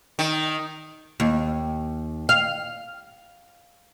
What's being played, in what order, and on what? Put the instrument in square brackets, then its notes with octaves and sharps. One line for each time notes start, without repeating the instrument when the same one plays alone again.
[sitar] D#3
[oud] D#2
F5